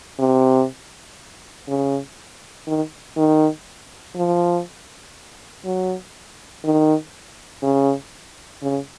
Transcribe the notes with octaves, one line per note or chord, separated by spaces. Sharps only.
C3
C#3
D#3
D#3
F3
F#3
D#3
C#3
C#3